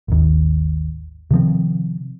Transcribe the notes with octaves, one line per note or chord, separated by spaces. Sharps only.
G#1 D#2
C3 D#3 F3 C4